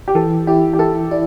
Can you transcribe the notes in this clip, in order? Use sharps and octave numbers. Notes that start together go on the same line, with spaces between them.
G4
E3 A4
E4 G4
G4
E4 A4
E4 D5